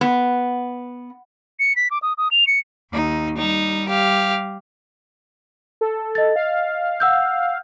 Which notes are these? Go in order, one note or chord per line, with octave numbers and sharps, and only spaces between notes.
B3
C#7
B6
D6
D#6
D#6
F7
C#7
D#2 D#4
G3 D#4
G4 F5
A4
D#5 A6
F5
F#5 E6 G6